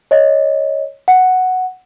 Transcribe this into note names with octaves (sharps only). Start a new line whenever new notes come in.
C#5 D#5
F#5